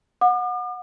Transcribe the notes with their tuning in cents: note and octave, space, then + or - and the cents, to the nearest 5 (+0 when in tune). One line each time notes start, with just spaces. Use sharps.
F#5 -25 D6 +45